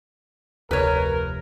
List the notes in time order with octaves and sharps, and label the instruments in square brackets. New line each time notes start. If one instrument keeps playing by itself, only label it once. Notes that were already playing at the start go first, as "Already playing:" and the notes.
[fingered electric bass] F1 [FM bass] D2 [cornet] A#4 [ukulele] B4 C#5